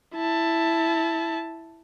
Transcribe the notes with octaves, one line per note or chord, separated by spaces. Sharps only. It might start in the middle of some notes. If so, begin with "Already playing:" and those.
E4 A5